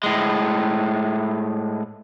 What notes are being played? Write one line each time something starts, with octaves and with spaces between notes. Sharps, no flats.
A2 G#3